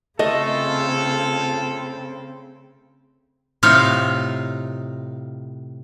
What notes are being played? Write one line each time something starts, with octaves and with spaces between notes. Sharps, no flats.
C#3 A3 C4 F4 A4 D#5
A2 C3 D#4 F4 F5